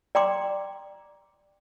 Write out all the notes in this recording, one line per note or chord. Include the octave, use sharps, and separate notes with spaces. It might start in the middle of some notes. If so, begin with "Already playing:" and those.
D5 G5 A#5 C6 D6